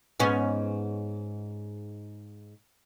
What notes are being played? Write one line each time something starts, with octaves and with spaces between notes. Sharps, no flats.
G#2 B3 C#4